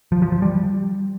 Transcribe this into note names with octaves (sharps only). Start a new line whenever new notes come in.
F3
F3
F3
G3